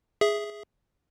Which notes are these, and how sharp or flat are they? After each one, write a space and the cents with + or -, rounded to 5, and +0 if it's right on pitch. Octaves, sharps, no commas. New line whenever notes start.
G#4 +0 E5 +0